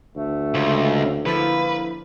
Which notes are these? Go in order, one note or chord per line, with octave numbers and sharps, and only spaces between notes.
D2 A3
C#2
D3 F3 A#3 E4 B4